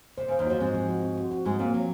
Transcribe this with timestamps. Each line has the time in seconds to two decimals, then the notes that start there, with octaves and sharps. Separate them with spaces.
0.18 C3 C5
0.28 C#3
0.32 C5
0.39 D#2 D#3
0.47 F2 F3 F#4
0.60 G#2 G#3 C4
0.75 F3
0.89 F#4
1.03 C4
1.17 F#4
1.31 F#4
1.45 G#2 G#3 F#4
1.59 A#2 A#3 C4
1.74 F3 F#3